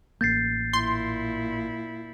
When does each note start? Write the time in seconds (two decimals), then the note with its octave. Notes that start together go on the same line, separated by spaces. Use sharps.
0.21 A1 A#3 G6 A6 C7
0.73 A#2 E4 C6